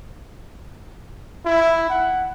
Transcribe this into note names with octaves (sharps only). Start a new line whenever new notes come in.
E4
F#5